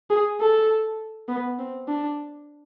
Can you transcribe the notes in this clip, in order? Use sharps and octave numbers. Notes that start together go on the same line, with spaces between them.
G#4
A4
B3
C4
D4